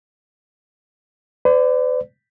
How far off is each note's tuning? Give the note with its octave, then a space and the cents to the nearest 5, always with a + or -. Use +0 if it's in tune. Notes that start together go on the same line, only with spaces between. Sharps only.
B4 +45 D5 +0